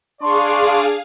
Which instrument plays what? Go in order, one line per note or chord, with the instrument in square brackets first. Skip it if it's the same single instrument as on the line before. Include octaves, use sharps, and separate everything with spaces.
[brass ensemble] D4 D5 [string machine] G#4 F5 [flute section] C6 C#6